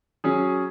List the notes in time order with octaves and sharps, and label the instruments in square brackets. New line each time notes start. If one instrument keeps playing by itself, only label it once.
[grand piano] F#3 C#4 G#4